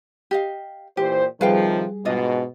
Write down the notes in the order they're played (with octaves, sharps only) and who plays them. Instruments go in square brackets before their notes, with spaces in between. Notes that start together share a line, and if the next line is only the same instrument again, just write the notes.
[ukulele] G4 D#5 F5
[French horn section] A#2 E3 C5 [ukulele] G4
[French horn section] C3 D#3 F3 [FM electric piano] G3 G#4 [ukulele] B4 F5 G5
[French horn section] G#2 B2 [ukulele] D4 F4 D#5